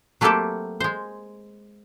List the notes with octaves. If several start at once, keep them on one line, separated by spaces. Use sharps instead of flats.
F#3 A3 A#3 C4 G4 A4
G#3 C5